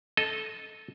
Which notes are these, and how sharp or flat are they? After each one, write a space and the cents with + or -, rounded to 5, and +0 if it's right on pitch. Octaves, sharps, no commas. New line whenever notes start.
A4 -10 D#5 +0